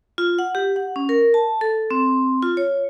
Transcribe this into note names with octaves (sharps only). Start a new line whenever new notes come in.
F4
F#5
G4
F#5
C#4
A#4
A5
A4
C4
F4
C#5